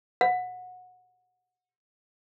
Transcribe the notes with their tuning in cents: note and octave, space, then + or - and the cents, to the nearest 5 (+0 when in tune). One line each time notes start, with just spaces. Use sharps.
F#5 -20